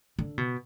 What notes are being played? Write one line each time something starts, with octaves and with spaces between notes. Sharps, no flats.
D3
B2